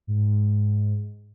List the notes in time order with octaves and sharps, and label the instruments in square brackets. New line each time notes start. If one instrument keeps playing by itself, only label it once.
[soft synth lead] G#2